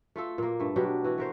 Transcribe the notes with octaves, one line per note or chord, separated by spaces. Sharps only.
A3 F4 A4
A#2 A#3
G2 A3
B2 F#3 D4 G4
E3 F#4
A3 A#4 C5